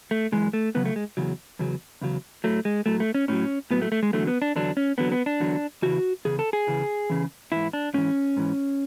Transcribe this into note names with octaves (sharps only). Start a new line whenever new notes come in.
A3
F#2 E3 G#3
A3
E2 C#3 F#3 B3
A3
G#3
E2 C#3 F#3
E2 C#3 F#3
E2 C#3 F#3
A2 F#3 A3
G#3
A2 F#3 A3
A3
C#4
A2 F#3 C#4
A2 F#3 B3
A3
A3
G#3
E2 D3 F#3 A3
B3
D4
E2 D3 F#3 D4
C#4
E2 D3 F#3 B3
B3
D4
E2 D3 F#3
E2 C#3 E3 F#4
E2 C#3 G#4
A4
G#4
E2 C#3 E3
E2 C#3 E3
G#2 E3 E4
D4
G#2 E3 C#4
G#2 E3